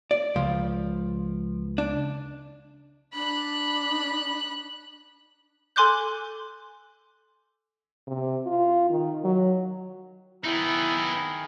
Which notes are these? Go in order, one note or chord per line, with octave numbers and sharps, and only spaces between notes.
D5
C#2 F3
D4
D4 B5 F#6
A4 G#5 C6 D6 F#6 G6
C3
F4
D#3
F#3
D#3 B3 D#4 E4 G#4